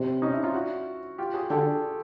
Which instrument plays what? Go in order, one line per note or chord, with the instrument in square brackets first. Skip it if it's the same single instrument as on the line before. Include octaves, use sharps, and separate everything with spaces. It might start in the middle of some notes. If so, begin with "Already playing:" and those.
Already playing: [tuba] C3 [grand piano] C4 D4
[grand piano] C#4 D#4
D4 E4
D#4 F4
E4 F#4
F4 G4
F#4 G#4
[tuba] D3 [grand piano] G4 A4